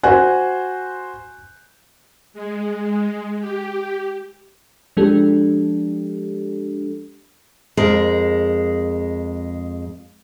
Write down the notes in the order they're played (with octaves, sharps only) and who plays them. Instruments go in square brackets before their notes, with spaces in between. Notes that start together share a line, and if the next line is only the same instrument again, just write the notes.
[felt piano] F#4 C5 F#6 [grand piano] G#5
[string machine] G#3
G4
[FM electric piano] F3 G#3 D4 G4 A4
[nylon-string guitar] F2 G#3 A#4